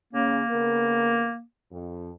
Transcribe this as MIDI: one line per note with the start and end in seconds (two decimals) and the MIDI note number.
0.13 0.41 49
0.13 1.41 58
0.13 0.41 61
0.50 1.32 49
0.50 1.32 59
0.50 1.32 70
1.71 2.10 41